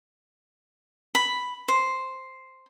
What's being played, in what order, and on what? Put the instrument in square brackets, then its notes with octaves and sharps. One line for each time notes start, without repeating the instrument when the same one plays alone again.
[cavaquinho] B5
C5